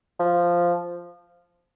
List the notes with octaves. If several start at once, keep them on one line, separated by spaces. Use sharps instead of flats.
F3